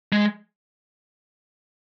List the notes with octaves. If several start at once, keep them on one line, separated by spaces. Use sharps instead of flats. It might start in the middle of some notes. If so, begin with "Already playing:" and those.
G#3